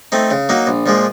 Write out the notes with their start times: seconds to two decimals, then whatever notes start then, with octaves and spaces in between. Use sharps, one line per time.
0.12 A3 C4 D#4
0.31 C#3
0.49 F#3 A#3 D#4
0.67 A#1
0.86 A#2 F3 G#3